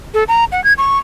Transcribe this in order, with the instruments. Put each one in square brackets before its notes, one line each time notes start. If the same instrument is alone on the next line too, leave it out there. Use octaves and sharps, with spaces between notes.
[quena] A4
A#5
F#5
G#6
C#6